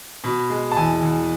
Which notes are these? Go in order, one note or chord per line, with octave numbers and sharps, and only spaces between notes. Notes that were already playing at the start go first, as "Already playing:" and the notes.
B2
G#3
A5
E2 G#5
E2